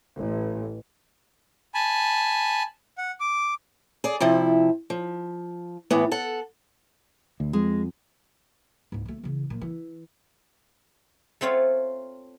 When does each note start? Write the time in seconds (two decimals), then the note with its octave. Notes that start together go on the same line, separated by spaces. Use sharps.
0.18 A1
1.74 G#5 A5 B5
2.98 F#5
3.20 D6
4.04 G#4 D5
4.20 C3 F3 E4
4.90 F3
5.90 A2 E3 B3
6.12 A4 F#5
7.40 D2
7.53 F2 G#3
8.92 C#2 G#2
9.06 D2 A3
9.24 C#3 E3
9.50 A#2 F3
9.61 E3
11.41 A3 C4 F4 C#5